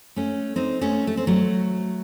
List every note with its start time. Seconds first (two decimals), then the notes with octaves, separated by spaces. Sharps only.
0.16 A3 C#4
0.56 C4 D#4
0.81 A3 C#4
1.07 A3
1.17 C4
1.27 F#3 A3